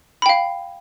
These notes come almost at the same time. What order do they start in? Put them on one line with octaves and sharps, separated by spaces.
B5 G5 F5